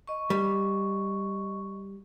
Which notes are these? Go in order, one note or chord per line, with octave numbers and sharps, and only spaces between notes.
D#5 C#6
G3